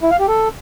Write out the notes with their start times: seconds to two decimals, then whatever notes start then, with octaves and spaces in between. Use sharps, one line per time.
0.03 E4
0.11 F5
0.20 G4
0.28 A4